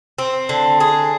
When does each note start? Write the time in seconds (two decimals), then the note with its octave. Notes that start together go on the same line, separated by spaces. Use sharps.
0.18 C4
0.49 D3
0.80 G#4